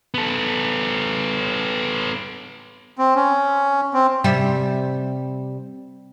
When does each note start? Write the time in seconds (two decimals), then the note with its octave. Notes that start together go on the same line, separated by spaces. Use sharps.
0.14 B3 A4
2.98 C4
3.16 C#4
3.94 C4
4.24 C3 G3 E5